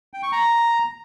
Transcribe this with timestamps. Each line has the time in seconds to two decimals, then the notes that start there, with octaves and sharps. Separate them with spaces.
0.14 G5
0.23 C#6
0.32 A#5